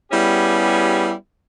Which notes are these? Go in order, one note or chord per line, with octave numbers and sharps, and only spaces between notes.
G3 B3 C#4 E4 G4 G#4